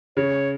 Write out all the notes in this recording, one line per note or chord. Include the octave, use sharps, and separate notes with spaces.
C#3 C#5